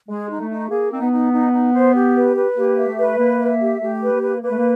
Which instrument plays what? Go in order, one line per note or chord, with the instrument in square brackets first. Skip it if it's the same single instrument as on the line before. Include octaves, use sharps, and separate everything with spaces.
[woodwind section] G#3 [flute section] G#4
[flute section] D#4
[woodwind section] A3
[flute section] D#4
[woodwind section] A#3 [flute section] G#4
[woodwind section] C4 [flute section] D#4
[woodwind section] B3
[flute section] D#4
D#4
D#4
C5
G4
B4
B4
[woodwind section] A#3 [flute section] G4
[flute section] E5
[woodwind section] A3
[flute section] B4
[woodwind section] A#3 [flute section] E5
[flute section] E5
G4
[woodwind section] A3 [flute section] G4
[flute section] B4
[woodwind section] A#3
[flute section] B4
[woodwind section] A#3 [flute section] B4
[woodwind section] A3
A#3